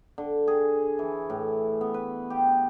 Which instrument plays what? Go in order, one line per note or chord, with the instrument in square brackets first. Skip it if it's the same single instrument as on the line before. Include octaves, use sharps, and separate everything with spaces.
[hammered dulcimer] D3
G#4
E3
A2
B3
B4
G4